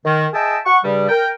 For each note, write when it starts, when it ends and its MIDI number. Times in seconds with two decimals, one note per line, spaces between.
0.05 0.26 51
0.33 0.57 68
0.33 0.57 75
0.33 0.57 76
0.33 0.57 79
0.33 0.57 81
0.66 0.79 78
0.66 0.79 85
0.84 1.07 43
0.84 1.07 49
0.84 1.07 55
1.09 1.28 70
1.09 1.28 79